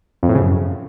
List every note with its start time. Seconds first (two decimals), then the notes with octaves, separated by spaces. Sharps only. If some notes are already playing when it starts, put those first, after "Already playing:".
0.23 F2
0.29 A2
0.35 C#3
0.41 F#2